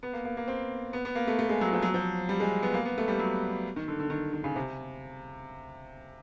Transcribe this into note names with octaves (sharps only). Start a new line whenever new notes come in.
B3
A#3
A#3
A#3
C4
B3
B3
A#3
A3
A3
G#3
F#3
F3
F#3
F3
G3
G#3
B3
A#3
B3
A3
G3
F#3
D#3
D3
D3
D#3
D#3
C#3
C3